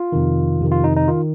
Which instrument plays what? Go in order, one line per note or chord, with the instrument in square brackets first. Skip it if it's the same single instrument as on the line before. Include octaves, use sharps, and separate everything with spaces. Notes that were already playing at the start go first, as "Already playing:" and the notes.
Already playing: [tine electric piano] F4
F2 C3 D#3
F2 C3 D#3
F4
D#4
D#4
D#3 F4